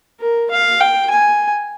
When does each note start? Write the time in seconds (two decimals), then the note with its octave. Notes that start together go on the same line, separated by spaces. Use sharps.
0.20 A#4
0.51 F5
0.81 G5
1.10 G#5